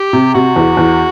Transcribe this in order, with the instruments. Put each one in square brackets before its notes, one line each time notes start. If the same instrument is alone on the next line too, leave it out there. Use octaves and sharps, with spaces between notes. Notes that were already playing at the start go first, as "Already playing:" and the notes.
Already playing: [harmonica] G4
[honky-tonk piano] C3
[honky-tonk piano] C3 [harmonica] F#4
[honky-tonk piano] E2
E2